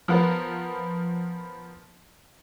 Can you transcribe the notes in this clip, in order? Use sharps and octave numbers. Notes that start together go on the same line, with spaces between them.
F3 B3 A#4